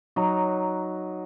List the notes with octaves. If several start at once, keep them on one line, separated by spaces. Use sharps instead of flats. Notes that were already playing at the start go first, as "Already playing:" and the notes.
F#3 D#4 A#5